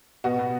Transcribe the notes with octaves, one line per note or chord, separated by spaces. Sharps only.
B2 F#4
B2